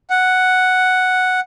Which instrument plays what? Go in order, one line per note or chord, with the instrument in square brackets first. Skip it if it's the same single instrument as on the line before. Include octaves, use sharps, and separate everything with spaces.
[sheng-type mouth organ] F#5